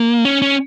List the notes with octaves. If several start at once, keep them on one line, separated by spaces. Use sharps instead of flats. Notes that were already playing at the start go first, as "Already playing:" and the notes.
Already playing: A#3
C#4
C#4